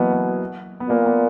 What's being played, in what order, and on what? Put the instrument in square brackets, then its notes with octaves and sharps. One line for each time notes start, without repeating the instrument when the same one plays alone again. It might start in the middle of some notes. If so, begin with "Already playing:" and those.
Already playing: [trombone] B2 [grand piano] E3 F#3 A#3 B3
[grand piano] B3
B3
[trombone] A#2 [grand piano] A#3
[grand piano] B3